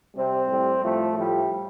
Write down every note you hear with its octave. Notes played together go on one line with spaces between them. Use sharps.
C3 G3 C4
A2 G3
A2 F3 A3
A2 F3 G3